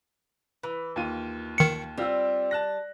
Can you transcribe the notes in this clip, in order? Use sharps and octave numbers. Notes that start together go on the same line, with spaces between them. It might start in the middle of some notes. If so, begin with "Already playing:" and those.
E3 B4
D#2 F4 D#7
D#3 C#7
G3 C4 F4 E6
A5 F#6 A#6